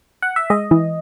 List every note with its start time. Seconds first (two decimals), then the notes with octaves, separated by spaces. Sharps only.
0.22 F#5
0.36 E5
0.50 G#3 D#5
0.71 E3